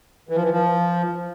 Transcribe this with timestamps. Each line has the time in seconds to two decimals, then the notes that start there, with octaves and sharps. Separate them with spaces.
0.29 E3
0.36 F3
0.43 E3
0.52 F3